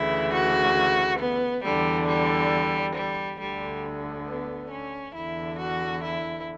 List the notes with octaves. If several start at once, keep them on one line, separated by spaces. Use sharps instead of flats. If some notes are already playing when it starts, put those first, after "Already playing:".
Already playing: D2 C#3 E3 E4
F#4
B3
E2 D3 G3
G3
G3
D2 D3 G3
B3
C#4
E2 D3 E4
F#4
E4